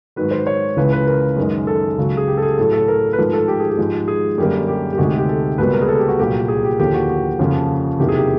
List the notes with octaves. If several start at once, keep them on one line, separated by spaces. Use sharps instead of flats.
G#2 D#3 F#3 B4
C5
C#5
C#2 C#3 E3 B4
B4
A#4
F#2 D#3 G#3
A4
C#2 C#3 F#3
G#4
G4
A4
G#4
A2 F#3 A3 A4
A4
A#4
B4
G#2 F3 A3 A#4
A4
G4
G#4
G4
G#2 F3 G#3
G#4
F#2 D3 G3 A#3 G4
G4
G4
D2 C3 D#3 G#3 F#4
G4
G4
A4
C#2 B2 G3 A#3 B4
A#4
G#4
A4
G4
F#4
C2 A#2 F#3 A#3 G4
G#4
G4
D#2 D3 F3 A#3 G4
F#4
F#4
F2 C#3 F3 A#3
E2 C3 D#3 F#3 A#3 G4
G#4
G4